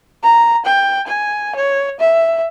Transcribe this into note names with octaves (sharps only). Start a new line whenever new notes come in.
A#5
G5
G#5
C#5
E5